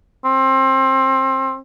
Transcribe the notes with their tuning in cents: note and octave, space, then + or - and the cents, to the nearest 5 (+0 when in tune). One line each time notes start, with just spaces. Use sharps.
C4 +25